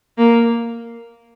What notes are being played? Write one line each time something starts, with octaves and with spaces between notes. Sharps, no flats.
A#3